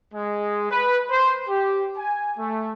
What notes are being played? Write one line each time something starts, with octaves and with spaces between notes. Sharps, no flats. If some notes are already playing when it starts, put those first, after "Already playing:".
G#3
B4
C5
G4
G#5
A3